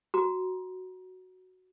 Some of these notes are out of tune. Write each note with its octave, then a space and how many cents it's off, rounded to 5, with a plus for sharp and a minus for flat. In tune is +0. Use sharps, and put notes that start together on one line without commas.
F#4 +0 A#5 +30